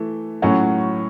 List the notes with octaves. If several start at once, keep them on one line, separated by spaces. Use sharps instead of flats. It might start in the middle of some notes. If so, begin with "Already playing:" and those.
Already playing: E3 A3
A2 F#3 C#4 F#4